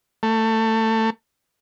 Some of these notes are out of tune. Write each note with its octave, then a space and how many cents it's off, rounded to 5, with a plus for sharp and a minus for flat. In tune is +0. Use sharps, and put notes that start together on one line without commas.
A3 +20